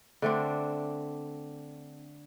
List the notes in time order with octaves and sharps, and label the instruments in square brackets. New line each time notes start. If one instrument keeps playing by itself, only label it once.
[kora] D3 A3 C4 D4